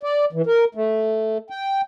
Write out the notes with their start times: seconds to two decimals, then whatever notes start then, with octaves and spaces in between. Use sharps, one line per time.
0.03 D5
0.33 E3
0.46 A#4
0.75 A3
1.50 G5